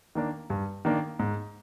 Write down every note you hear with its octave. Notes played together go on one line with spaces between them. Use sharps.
D#3 A#3 D4
G2
D#3 A#3 D4
G#2